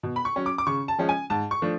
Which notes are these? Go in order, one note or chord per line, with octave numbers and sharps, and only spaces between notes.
B2
B5
C#6
F#3 C#4
D6
D6
C#3 C#6
A5
F3 G#3 C#4
G#5
G#2 A5
C#6
F3 A3 D4